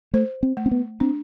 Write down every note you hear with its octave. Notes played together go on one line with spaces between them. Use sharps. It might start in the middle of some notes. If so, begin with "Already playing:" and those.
A3 C5
C4
A3
C4
B3
C4 D4